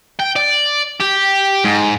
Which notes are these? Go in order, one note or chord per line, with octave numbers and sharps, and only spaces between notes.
G5
D5
G4
G#2